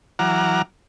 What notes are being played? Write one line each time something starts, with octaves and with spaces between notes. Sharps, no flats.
E3 F#3 F#5 A#5 D6 F6